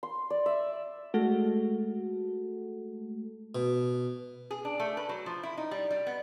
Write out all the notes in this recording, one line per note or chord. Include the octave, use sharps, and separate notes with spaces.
C6
D5
E5
G#3 A3 F#4 A4
B2
G#4
D4
A3
B4
F#3
F3
E4
D#4
G3
G3
B3